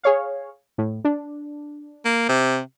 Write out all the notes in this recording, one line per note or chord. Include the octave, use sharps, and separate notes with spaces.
G#4 C#5 F5
A2
D4
A#3
C3